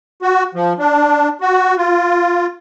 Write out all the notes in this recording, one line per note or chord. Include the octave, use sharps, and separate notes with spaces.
F#4
F3
D4
F#4
F4